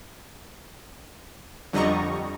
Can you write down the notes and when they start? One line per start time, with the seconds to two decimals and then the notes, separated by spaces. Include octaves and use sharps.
1.73 F2 D3 G3 D#5 A#5 C#6